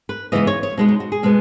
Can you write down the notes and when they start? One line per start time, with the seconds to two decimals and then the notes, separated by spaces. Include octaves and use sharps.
0.09 B4
0.32 C#3 E3 G#3 B3 D#5
0.47 C#5
0.63 C#5
0.77 B2 G#3 B3 D#4
0.88 D#4
1.00 F#4
1.12 G#4
1.23 B2 G#3 B3